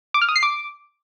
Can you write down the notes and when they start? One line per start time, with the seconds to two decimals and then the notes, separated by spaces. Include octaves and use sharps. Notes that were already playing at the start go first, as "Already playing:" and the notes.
0.14 D6
0.21 F6
0.29 D#6
0.36 C7
0.43 D6